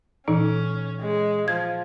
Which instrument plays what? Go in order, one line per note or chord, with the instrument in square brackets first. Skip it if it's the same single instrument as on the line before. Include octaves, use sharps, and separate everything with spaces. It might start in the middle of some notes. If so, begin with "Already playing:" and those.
[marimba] A#2 E3 D#4 [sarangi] C#4
[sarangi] G#3
[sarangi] F3 [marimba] G#6